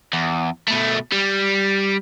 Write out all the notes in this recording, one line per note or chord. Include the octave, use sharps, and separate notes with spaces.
E2
B2 A3
G3